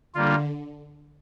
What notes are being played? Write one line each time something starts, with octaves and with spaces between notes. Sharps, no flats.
D3 G3 A#3 F4